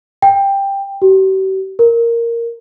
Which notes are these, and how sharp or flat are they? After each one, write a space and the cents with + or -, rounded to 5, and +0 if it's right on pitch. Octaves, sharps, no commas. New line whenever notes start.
G5 +10
G4 -45
A#4 -5